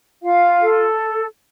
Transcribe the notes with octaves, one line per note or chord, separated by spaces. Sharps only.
F4 F5
A4